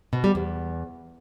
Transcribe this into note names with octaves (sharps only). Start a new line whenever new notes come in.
B2
G3
E2